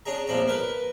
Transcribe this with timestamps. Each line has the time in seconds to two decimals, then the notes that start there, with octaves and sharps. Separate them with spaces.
0.06 C#4 D4 G#4 A#5
0.27 A#1 E2 F3 D4 A#5
0.48 A#4 B4